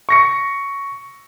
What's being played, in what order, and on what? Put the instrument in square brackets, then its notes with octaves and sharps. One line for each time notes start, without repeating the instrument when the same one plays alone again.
[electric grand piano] C#6 A#6 C#7